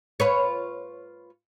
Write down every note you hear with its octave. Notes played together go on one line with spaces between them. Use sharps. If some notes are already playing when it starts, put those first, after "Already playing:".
F4 B4 C#5